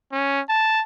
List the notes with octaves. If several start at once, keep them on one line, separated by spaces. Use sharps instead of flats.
C#4
A5